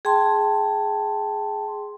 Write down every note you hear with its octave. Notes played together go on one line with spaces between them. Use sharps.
G#4 G5 A5 C6